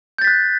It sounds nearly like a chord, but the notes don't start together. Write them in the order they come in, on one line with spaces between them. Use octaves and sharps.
G6 A6 B6 F#6